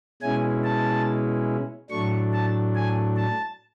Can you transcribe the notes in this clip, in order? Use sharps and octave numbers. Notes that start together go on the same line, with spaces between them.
B2 G#3 C#4 E4 G#5
A5
A2 F#3 A3 D4 C#6
A5
G#5
A5